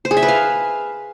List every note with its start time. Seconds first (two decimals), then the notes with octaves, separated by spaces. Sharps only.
0.05 C5
0.11 G#4
0.17 E5
0.23 B4
0.28 F5